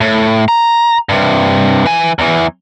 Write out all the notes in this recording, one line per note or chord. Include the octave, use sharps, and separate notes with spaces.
A2
A#5
G2 C3
E3 G#5
E2 E3